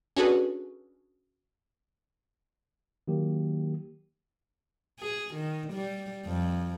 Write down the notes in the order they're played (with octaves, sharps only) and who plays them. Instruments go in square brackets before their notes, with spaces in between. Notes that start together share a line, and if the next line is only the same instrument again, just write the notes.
[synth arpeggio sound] C#4 D4 F#4 G#4 A4 B4
[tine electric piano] D#3 F#3 A#3 G4
[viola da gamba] G#4
D#3
G3
F2